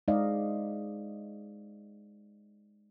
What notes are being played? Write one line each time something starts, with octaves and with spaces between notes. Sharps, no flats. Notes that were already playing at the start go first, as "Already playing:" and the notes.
G#3 D#4 C5 D5 D#5 F5